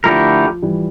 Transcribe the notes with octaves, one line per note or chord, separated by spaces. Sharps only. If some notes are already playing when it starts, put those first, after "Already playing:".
D3 F3 A3 E4 G4 A#4
E3 G3